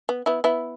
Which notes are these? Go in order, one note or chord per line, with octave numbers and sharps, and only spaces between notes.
B3
B3 E4
B3 E4